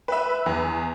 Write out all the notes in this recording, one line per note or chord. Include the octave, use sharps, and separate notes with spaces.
B4 E5
E2